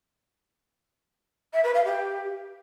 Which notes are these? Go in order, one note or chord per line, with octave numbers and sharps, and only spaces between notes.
E5
B4
F5
G4